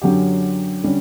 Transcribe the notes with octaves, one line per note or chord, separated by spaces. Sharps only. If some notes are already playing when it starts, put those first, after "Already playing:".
F#2 D3 F#3 C#4 G4
D3 G3 C#4